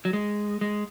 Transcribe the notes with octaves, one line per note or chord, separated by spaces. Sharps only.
F#3
G#3
G#3